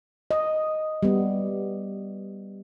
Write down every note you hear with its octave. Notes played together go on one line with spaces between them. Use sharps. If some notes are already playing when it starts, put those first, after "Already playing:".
D#5
G3 B3